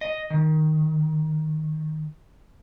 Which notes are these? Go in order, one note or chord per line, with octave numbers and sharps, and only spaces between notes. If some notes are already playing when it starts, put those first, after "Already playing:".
D#5
D#3